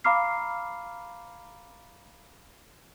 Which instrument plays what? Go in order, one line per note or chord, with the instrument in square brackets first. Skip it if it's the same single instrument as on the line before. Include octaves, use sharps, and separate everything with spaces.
[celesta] F5 A#5 B5 D6 F6 C7